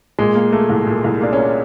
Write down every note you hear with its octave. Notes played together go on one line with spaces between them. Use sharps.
A#2 G#3
A#3
A3 A#3
C2
A#2
C2
A#3 D4
A#3 C#4